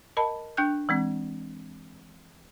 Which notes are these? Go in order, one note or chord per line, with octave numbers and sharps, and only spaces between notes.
A#4 D#5 A5 B5
D4 G5 F#6 G6
E3 G#3 C4